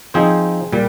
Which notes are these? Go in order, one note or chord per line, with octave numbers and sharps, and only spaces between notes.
F3 C4 D#4 G#4 C5
A#2 G3